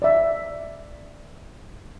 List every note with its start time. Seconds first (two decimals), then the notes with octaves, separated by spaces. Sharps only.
0.02 D5 E5